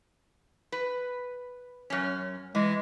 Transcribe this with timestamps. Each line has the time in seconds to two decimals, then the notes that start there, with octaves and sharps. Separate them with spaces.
0.72 B4
1.90 F#2 C#4
2.55 E3 G#3